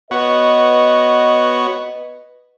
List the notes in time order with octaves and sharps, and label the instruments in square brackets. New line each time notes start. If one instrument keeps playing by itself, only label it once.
[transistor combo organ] B3 F#4 C#5 [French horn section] B4 D#5